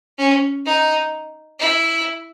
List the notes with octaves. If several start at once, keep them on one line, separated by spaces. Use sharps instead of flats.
C#4
D#4
E4